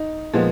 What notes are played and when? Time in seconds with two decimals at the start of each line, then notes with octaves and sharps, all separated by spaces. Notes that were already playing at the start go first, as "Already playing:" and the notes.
Already playing: D#4
0.33 A#2 F3 G#3 B3